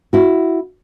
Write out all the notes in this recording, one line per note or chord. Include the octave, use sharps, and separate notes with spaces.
E4 F#4